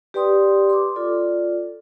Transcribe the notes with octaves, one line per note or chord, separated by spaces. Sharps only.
G4 B4 D5 G5 C6 D#6
C6 D6
F4 A4 D5